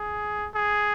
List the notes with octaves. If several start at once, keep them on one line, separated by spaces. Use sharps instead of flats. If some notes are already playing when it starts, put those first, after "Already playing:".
Already playing: G#4
G#4